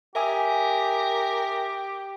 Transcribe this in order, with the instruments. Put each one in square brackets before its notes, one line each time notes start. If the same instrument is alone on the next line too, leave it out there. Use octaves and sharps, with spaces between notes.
[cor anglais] G4 [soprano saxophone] A#4 [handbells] E5 G#5 D#6